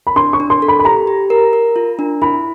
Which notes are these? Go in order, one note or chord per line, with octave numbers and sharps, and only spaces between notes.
B5
D4 C6
C#6
D4
C6
A4
B5
B5
G4 A#5
G4
A#4
A#4
F4
D4
E4 B5